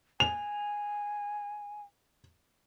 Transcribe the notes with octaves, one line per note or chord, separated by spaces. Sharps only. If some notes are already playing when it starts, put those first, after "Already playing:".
G#5 F7